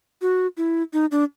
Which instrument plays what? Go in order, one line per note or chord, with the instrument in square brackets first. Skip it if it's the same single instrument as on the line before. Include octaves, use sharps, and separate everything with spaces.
[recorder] F#4
E4
D#4
D4